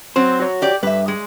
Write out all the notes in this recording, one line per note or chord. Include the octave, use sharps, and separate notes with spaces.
F#3 C4 C5
F#4 C#5
G4 D5
G2 B4 E5
G#3